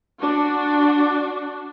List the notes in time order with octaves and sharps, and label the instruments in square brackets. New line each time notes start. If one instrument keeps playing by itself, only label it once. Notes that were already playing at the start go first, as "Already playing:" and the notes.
[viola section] D4 F#4